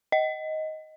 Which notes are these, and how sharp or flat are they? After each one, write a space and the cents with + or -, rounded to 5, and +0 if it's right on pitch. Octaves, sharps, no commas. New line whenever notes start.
D#5 +10